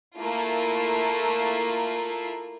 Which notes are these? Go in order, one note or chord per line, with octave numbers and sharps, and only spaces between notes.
A3 A#3 E4 F4